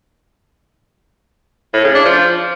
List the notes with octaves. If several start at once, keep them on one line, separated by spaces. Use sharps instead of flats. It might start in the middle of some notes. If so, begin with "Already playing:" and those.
A2
C#3
D4
F3